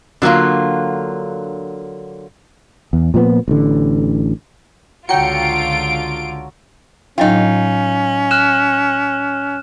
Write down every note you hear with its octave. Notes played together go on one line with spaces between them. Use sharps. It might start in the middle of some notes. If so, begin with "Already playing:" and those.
D3 F#3 G3 A#3 F4
E2
A#2 F3 G3 B3
A1 D3
C#2 D3 F#3 F4 G5 C#7 D7
A2 F#3 C#4 D#4 F4 G5
F6 F#6 E7